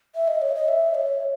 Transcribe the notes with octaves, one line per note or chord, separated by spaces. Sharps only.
E5
D#5
C#5
D#5
E5
C#5